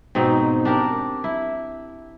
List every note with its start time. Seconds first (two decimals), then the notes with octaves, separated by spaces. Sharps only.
0.15 G#2 B2 C4 D#4
0.65 D4 G4 A#4
1.24 E4